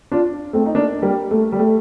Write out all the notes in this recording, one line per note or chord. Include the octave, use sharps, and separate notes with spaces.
D4 F4
A3 C4
D#4
A#3 D4
G3 A#3
A3
G3
A3